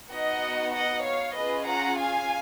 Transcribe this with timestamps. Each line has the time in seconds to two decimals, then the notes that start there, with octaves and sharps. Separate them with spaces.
0.13 B3 D#4 F#4 D#5 F#5
0.76 D#5 F#5
1.07 C#5 F5
1.38 C#4 F4 G#4 B4 D#5
1.69 F#5 A#5
2.01 F5 G#5